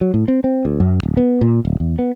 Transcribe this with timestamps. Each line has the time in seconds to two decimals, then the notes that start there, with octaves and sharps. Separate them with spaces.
0.01 F#3
0.14 A2
0.28 C4
0.44 C4
0.65 D2
0.80 F#2
1.03 D1
1.17 B3
1.41 A#2
1.65 D1
1.80 E2
1.99 B3